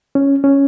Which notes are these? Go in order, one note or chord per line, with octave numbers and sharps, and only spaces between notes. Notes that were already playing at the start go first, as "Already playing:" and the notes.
C#4
C#4